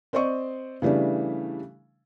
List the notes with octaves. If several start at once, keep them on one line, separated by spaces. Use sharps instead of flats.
C4 C5 D5 D#5 C#6
C#3 E3 G3 A3 D4